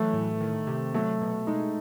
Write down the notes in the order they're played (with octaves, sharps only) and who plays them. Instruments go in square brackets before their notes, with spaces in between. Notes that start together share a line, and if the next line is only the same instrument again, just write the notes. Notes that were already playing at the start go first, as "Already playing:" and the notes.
Already playing: [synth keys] E3 F#3 [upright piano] A3
[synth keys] A2
D#3
C3
[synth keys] F#3 [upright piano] A3
[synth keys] B2
[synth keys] G#3 [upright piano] D#4